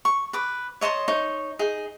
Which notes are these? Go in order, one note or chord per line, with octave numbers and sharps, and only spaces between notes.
C#6
B4 D6
C#5 D#5 A5 C6
D#4 C#5
D#4 G#4